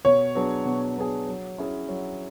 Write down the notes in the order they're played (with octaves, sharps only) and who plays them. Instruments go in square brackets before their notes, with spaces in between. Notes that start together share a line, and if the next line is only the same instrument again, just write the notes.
[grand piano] B2 [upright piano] C#5
[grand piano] F#3 B3 D4 G#4
B2
F#3 B3 D4 G#4
F#3
C#4 E4 G#4
F#3